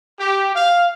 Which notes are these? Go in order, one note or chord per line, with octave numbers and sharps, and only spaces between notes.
G4
F5